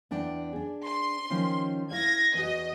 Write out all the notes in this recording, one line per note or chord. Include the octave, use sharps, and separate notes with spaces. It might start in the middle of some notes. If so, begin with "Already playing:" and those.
E2 D4 G5
D4 G#4
C6
D#3 F3 C#4
E4 F5 G#6 A#6
E2 F#4 D#5